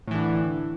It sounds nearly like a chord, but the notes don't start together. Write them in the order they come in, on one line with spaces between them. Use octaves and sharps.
A2 E3 D3